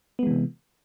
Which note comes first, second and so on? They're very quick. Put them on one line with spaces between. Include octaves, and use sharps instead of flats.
B3 G#3 E3 C3